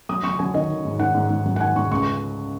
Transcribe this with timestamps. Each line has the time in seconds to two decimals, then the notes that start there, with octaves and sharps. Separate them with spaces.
0.09 F#3 D#6
0.24 F#3 C#6
0.39 F#3 G#5
0.54 D#3 D#5
0.70 D#3
0.85 G#2
0.99 D#3 F#5
1.14 G#2
1.30 G#2
1.46 F#3
1.56 F#5
1.61 D#3 G#5
1.76 G#2 C#6
1.91 C#2 C#6
2.02 C#6